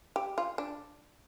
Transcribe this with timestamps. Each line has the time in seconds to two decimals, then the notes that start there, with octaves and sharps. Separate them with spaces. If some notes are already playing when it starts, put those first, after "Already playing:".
0.16 G4
0.38 F4
0.58 D4